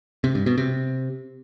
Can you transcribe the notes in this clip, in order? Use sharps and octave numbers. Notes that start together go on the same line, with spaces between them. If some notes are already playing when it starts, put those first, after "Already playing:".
C3
G2
B2
C3